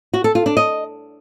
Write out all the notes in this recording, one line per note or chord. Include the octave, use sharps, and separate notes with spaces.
F#4
A4
F4
D4
D#5